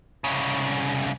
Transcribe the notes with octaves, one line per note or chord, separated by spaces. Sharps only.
C2 C#3